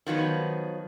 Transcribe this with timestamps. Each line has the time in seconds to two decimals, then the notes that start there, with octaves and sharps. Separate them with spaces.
0.07 D#3 F3 F#3 B3